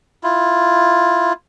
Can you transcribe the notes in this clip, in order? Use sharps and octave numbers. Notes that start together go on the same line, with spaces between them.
E4 F4